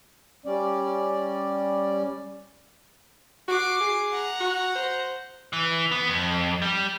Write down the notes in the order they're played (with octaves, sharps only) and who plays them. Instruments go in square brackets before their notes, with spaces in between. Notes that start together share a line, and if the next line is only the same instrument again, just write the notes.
[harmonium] G3 C#4 D5
[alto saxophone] F#4 [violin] D6 C7
[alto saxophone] G#4
[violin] F#5 A#5
[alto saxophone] F#4
C5
[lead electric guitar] E3
B3
F2
G3